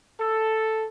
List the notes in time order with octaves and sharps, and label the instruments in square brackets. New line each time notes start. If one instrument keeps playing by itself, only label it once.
[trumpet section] A4